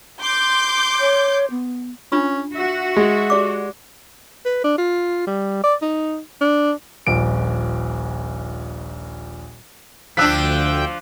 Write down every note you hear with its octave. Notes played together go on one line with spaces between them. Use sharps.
C6 D6 G6
C#5
B3
C#4 D4 F4 B5
F#4 E5
G#3
G4 D5 D6
B4
D4
F4
G3
D5
D#4
D4
D#1 A#1 D7
D2 F3 D4 G5 E6 F#6 B6